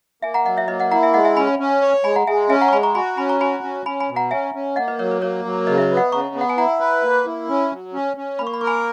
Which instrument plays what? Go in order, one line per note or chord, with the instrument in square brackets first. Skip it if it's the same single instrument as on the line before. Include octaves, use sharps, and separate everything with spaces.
[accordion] A#3 [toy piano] E5 G#5
[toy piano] F#5 A#5
[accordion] F#3 [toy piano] D#5 F#5
[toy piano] C#5 E5
[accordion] A#3 [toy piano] B4 D#5
[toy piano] D#5 F#5
[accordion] E4 [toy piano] F#5 A#5
[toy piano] E5 G#5
[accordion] G#3 [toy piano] D#5 F#5
[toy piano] E5 G#5
[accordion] C#4 [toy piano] G#5 B5
[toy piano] G#5 B5
[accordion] C#4
C#5
[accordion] G#3 [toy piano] G#5 B5
[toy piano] F#5 A#5
[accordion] G#3 [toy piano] E5 G#5
[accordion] C#4 [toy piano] E5 G#5
[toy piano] F#5 A#5
C#6
[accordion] G#3 [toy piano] G#5 B5
[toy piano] A#5 C#6
[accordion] F#4 [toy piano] G#5 B5
[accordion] C#4 [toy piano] G#5 B5
[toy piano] A#5 C#6
[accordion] F#4 [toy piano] G#5 B5
[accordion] C#4
[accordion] C#4 [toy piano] G#5 B5
[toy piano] G#5 B5
[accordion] B2
[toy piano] F#5 A#5
[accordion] C#4 [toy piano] E5 G#5
[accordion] C#4
[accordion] A#3 [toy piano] D#5 F#5
[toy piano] B4 D#5
[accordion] F#3 [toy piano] A#4 C#5
[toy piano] B4
[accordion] A#3 [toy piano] A#4 C#5
[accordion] F#3
[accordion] C#3 [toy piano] B4 D#5
[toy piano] E5
B4 D#5
[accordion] B3
[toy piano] D#5 F#5
[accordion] C#3 [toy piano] A#5 C#6
[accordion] B3
[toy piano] F#5
G#5
[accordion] E4 [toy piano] F#5 A#5
[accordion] B4
A#3
E4
C#4
F#3
C#4
C#4
[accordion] A#3 [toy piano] B5
[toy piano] C#6
B5
[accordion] A#4 [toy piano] C#6
[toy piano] G#5 B5